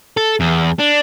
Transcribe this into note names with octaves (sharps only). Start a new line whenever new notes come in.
A4
E2
D4